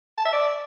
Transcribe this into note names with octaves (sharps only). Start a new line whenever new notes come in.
A5
E5
D5